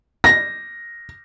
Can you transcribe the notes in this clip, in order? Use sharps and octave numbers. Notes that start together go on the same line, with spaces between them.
A#6